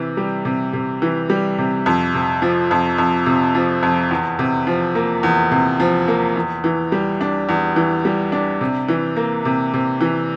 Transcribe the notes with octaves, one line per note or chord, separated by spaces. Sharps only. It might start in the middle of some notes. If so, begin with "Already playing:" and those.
Already playing: C3 E3
G3
C3
C3
E3
G3
C3
F2
C3
F3
F2
F2
C3
F3
F2
E2
C3
F3
A#3
E2
C3
F3
A#3
E2
E3
G3
D4
E2
E3
G3
D4
C3
E3
A#3
C3
C3
E3